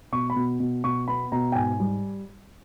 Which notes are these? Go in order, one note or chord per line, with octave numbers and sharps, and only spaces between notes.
B2 C#6
B5
B2
B2
B2 C#6
B3 B5
B2 A#5
G5
G#2 G#5
G3